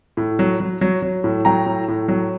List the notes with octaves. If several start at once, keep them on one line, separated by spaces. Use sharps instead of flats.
A2
F#3
F#3
F#3
F#3
A2
F#3 G5 A#5
A2
A2
F#3